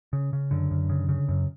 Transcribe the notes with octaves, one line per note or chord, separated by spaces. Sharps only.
C#3
C#3
F#2 D3
F#2
C#3
C#3
F#2